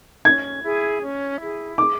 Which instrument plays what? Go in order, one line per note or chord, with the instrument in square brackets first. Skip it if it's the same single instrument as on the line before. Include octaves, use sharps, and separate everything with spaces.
[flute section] C#4 [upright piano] G#6
[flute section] E4 G#4
C#4
E4 G#4
[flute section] G#4 [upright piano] D6